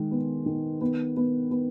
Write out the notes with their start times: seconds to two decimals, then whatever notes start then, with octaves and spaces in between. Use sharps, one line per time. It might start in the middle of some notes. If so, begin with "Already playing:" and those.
Already playing: D#3 G#3
0.11 B3
0.46 D#3
0.81 B3
1.17 B3
1.51 B3